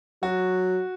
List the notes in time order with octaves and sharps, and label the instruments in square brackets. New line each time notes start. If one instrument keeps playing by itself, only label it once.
[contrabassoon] F#3 [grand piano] F#4